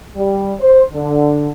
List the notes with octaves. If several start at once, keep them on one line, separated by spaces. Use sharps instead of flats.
G3
C5
D3